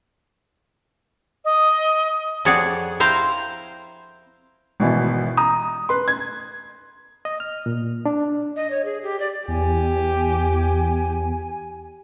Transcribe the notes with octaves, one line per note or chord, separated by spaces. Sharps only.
D#5
F2 F#4 G#4 C#5 D5 F#5
E4 C5 F5 G5 A#5
G#1 B2 E3
A#5 D#6
B4 C6
G#6
D#5
F6
A#2
D4
D#5
C#5
G#4
G4
D5
E2 G4 G#5